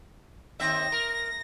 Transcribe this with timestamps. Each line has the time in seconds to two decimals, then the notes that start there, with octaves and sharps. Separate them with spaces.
0.60 D#2 C4 E5 A#6
0.92 A#4